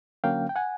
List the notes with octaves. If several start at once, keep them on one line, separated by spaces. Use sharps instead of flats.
D3 F#3 A#3 C#4 F5 G5
G5
F#5 G#5